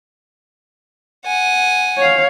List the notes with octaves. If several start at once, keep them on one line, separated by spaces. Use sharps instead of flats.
F#5 G#5
C#5 F5